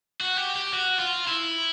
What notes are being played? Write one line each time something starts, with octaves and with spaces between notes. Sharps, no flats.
F#4
G4
G4
F#4
F4
E4